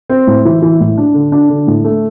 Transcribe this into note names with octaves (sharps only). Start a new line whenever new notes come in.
C4
A2
E3
E3
A2
D4
D3
D4
D3
A2
A3